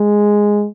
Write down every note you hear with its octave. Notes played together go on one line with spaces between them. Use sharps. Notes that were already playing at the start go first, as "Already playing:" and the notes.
Already playing: G#3